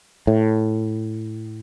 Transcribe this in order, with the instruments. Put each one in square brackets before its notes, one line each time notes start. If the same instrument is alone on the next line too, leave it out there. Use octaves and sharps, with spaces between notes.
[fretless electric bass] A2